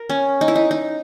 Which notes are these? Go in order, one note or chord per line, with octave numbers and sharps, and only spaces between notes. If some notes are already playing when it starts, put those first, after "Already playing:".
Already playing: A#4
C#4
D#4
E4
D#4
D#4